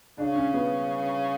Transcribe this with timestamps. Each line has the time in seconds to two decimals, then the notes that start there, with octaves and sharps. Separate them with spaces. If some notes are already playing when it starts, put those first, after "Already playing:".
0.18 C#3 D4
0.36 C#4
0.54 B3